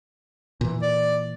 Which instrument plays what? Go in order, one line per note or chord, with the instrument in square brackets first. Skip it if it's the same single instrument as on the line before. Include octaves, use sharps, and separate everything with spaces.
[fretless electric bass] A#2 E3
[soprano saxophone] D5